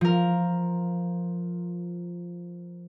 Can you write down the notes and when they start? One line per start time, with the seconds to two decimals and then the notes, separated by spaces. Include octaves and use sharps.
0.01 F3 A#4